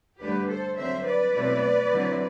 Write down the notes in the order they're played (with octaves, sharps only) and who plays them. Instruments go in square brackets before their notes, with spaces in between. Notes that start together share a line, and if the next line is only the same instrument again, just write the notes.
[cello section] G2 D3 A3 D4 G4 B4
A4 C5
D3 F#3 C4 C5 E5
B4 D5
B2 F#3 A3 C4 E4
D3 F#3 C4 E4